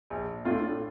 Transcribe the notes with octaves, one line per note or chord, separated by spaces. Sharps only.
A#1
A2 A3 D4 F4